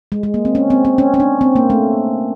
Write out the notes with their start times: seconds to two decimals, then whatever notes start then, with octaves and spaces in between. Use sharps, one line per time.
0.12 G#3
0.23 G#3
0.34 A#3
0.45 C4
0.55 C#4
0.70 C4
0.85 C4
0.98 C#4
1.14 C#4
1.20 D4
1.41 C4
1.56 A#3
1.70 A3